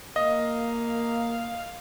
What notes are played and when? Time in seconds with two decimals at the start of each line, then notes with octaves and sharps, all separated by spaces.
0.16 A#3 D#5 F5